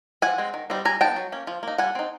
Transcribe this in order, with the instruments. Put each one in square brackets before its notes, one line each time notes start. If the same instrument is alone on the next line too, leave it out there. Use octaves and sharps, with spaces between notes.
[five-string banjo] F3 F#5 G#5
G#3 C4
D#3
G3 C4 D#4
G3 G#5 A#5
B3 D#4 G5 A5
F#3
A#3 C#4
F3
A#3 D#4
G3 F#5 G#5
C4 D#4